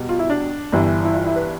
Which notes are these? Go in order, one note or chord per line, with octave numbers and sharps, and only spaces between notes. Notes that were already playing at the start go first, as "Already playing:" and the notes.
Already playing: E2 B2 G3
F4
E4
D4
G1 G2 E3
E4
F4
E4
B4